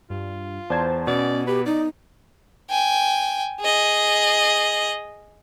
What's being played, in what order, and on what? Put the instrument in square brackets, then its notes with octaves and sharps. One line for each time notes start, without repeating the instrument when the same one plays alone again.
[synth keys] G2 [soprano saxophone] F4
[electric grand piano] E2 G#6 [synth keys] C5 D5 A5
[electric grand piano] B2 [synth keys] B3 [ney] C#4 [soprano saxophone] D5
[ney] G4 [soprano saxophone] B4
[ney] D#4 [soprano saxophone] D5
[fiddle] G5 G#5
G#4 D#5